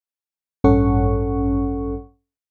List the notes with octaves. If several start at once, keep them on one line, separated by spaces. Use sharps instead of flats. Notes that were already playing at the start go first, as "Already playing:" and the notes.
A1 G2 C#4 A4 F#5 C#6